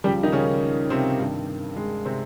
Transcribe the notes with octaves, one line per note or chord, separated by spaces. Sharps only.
C#2 C#3 F3 G3 G4
D#3 D#4
C#3 C#4
C3 C4
G2 D#3
G#3
C3 C4